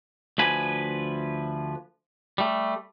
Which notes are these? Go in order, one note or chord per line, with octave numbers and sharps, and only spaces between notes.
D2 F3 B4 G#5
G3 A3